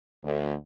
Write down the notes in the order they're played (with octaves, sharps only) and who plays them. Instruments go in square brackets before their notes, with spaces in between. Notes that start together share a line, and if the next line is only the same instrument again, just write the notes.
[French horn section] D2